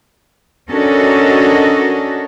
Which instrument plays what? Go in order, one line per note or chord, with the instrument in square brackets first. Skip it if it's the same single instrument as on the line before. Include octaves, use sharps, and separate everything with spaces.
[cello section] C#4 D4 F#4 A4 A#4 D#5